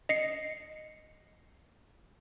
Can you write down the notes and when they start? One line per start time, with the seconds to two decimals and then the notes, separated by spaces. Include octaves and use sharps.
0.09 D#5 C7 C#7